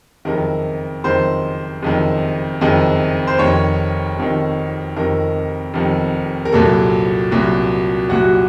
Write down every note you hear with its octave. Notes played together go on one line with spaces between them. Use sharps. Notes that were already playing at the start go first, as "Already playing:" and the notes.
F#1 F2 D#3 A#4
F#1 F2 D#3 C5
F#1 F2 D#3
F#1 F2 D#3
C5
F1 F2 D#3 C#5
F1 F2 D#3
F1 F2 D#3 A#4
F1 F2 D#3
A#4
C2 A#2 F#3 A4
C2 A#2 F#3
C2 A#2 F#3 F#4